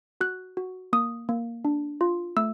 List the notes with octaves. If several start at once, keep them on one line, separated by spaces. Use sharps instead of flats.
F#4 F#6
F#4
A#3 D#6
A#3
D4
F4
A3 E6